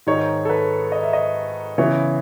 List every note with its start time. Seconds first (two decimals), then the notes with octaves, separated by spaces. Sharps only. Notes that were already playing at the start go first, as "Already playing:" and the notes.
0.07 G#2 D#3 G#3 D#4 C#5
0.45 A4
0.50 B4
0.92 D#5
1.03 E5
1.13 D#5
1.78 C#3 E3 B3 E4 C#5